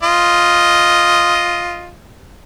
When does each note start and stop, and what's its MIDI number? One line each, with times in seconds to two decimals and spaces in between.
0.03 1.92 65
0.03 1.92 75